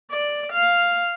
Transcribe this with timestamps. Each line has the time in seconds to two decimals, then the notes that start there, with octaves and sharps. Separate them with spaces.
0.11 D5
0.52 F5